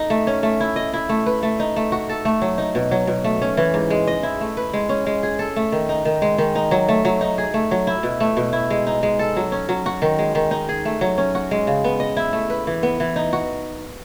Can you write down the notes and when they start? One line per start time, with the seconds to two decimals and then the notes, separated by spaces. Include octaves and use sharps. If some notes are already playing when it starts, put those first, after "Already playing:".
Already playing: D#4 A4
0.10 A3
0.27 C#4
0.43 A3
0.60 E4
0.76 D#5
0.94 E4
1.09 A3
1.26 B4
1.43 A3
1.60 D#4
1.76 A3
1.92 F#4
2.09 A4
2.25 A3
2.42 F#3
2.58 D#4
2.75 B2
2.91 F#3
3.07 B2
3.24 A3
3.42 C#4
3.57 E3
3.74 G#2
3.90 G#3
4.07 D#5
4.23 E4
4.41 A3
4.57 B4
4.74 G#3
4.89 C#4
5.07 G#3
5.23 G#4
5.39 A4
5.56 A3
5.72 D#3
5.89 D#4
6.05 D#3
6.22 G#3
6.38 D#3
6.55 D#4
6.71 F#3
6.89 A3
7.05 F#3
7.21 D#4
7.38 G#4
7.54 A3
7.71 F#3
7.87 E4
8.03 B2
8.20 A3
8.37 B2
8.53 E4
8.70 G#3
8.87 D#4
9.03 G#3
9.19 A4
9.37 F#3
9.52 C#4
9.69 F#3
9.86 F#4
10.02 D#3
10.19 G#3
10.35 D#3
10.51 D#4
10.69 G#4
10.85 A3
11.01 F#3
11.18 C#4
11.35 F#4
11.51 G#3
11.67 C#3
11.84 B3
12.00 D#5
12.17 E4
12.33 A3
12.50 B4
12.67 E3
12.83 B3
13.00 E3
13.16 D#4
13.33 F#4